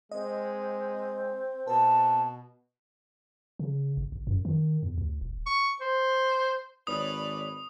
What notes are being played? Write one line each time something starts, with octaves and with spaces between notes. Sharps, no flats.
G#3 C4 D#5
B2 B4 A5
C#3
G1
F#1
F#2
D#3
E2
D2
D#1
C#6
C5
G#1 B4 C#5 D5 D#6